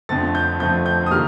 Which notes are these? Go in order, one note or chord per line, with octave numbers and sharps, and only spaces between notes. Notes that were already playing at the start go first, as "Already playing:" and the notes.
F2 D3 F3 A3 A6
G6
F2 D3 F3 A3 G6
G6
D#6
D#3 G3 A#3 F6